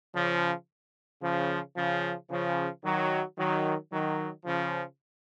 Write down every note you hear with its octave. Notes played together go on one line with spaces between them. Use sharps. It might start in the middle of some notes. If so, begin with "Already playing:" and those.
C#3 F3
C#3 F3
C#3 F3
C#3 F3
D#3 F#3
D#3 F#3
D#3 F#3
C#3 F3